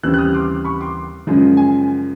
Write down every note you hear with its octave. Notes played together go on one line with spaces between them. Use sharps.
D#2 C#3 E3 G3 C4 E6 F#6
F#6
D#6 F6
C6 D6
B5 C#6
C6 D6
F#2 C#3 F3 G#3
G#5